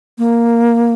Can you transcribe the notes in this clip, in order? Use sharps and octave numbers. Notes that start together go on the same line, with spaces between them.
A#3